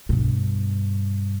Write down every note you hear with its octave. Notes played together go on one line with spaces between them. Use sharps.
G2 B2